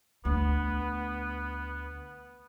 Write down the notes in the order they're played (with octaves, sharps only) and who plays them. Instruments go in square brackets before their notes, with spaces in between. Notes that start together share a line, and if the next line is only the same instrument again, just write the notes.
[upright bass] D2 [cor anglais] B3